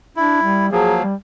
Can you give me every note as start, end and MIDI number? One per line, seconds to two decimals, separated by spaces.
0.17 0.42 62
0.17 0.67 64
0.42 0.68 55
0.72 1.03 53
0.72 1.03 54
0.72 1.03 58
0.72 0.95 68
1.02 1.14 55